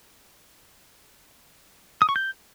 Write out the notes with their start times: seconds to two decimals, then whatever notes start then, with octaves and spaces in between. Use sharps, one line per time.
2.02 D#6
2.09 C#6
2.16 G6